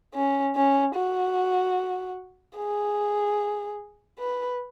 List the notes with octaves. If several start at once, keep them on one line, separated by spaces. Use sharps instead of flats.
C#4
C#4
F#4
G#4
B4